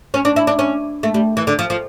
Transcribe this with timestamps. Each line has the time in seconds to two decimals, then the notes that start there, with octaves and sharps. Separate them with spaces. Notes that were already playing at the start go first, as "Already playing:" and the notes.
0.14 C#4
0.25 D4
0.36 E4
0.47 D4
0.59 C#4
1.03 A3
1.14 G3
1.37 E3
1.47 D3
1.59 F3
1.70 F3